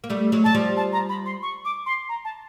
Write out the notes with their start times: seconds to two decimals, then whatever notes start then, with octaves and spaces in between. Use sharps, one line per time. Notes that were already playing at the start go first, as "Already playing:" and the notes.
0.04 A#3
0.10 G3 A3
0.32 F#3 G#3
0.44 F#3 A5
0.55 F3 G3
0.77 A5
0.92 A#5
1.09 B5
1.25 C6
1.42 C#6
1.65 D6
1.86 C6
2.09 A#5
2.24 A5